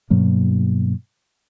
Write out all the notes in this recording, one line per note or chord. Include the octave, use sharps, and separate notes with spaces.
G2 B2 F#3 A#3